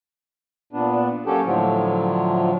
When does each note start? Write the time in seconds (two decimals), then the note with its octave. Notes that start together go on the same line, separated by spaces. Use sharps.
0.73 A#2 B3 D4
1.26 F#3 A#3 C#4 G4 A4
1.45 A2 D3 F3 F#3